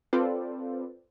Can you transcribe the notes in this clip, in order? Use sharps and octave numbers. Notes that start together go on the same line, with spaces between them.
C4 F4 A4 B4 C5 D5